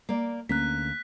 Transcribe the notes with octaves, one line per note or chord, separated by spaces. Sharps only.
A#3 D5
D2 A#3 C#4 F#6 B6